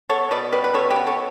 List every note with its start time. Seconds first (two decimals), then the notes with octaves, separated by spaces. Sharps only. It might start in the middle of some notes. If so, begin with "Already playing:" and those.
0.09 B3 A4 C#5
0.31 B2 B4 D5
0.52 G3 B4 D5
0.64 B4
0.74 B2 A4 C#5
0.91 G4 B4
0.96 B3
1.06 A4 C#5